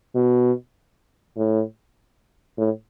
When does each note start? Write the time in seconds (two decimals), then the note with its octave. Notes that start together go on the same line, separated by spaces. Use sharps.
0.15 B2
1.37 A2
2.58 A2